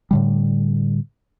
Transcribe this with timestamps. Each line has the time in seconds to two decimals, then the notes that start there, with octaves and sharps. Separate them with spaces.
0.11 A2 D3 G3